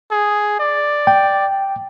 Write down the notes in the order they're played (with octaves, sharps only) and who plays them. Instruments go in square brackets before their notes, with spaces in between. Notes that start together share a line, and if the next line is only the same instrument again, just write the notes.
[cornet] G#4
D5
[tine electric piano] G5